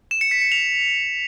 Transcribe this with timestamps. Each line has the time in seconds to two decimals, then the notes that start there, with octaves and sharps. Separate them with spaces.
0.11 E7
0.21 C#7
0.31 B6
0.41 C#7
0.52 F7